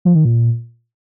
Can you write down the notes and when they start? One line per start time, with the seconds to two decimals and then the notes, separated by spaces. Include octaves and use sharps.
0.05 F3
0.15 D#3
0.25 A#2